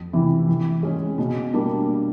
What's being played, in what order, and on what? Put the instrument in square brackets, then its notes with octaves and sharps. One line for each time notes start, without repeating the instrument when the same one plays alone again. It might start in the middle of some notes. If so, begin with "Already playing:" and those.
Already playing: [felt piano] F2
C3 E3
E3
G#3 C#4
B2
G3 A#3 D4